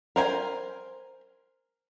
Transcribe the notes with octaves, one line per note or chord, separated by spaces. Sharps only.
A#4 C5 G#5